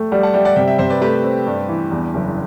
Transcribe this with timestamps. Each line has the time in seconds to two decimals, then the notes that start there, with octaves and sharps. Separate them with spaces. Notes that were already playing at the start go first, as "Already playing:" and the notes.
Already playing: A3 E5 G5
0.11 G3 D5 F#5
0.23 F#5 A5
0.33 G3 E5 G5
0.45 D5 F#5
0.56 C3 E5 G5
0.67 E5 G5
0.78 C3 C5 E5
0.90 B4 D5
1.01 A3 G4 B4
1.24 C4
1.47 G2
1.69 E3
1.92 E2
2.14 F#1